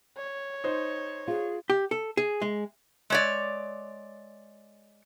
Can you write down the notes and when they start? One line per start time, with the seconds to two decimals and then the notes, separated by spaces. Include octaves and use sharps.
0.17 C#5
0.64 D#4 C5
1.28 F4 G#4
1.70 G4
1.91 A4
2.17 G#4
2.42 G#3
3.10 G#3 C#5 D5